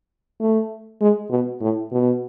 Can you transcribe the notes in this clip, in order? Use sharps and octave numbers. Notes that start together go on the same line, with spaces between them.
A3
G#3
B2
A2
B2